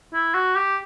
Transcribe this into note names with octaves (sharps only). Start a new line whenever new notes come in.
E4
F#4
G4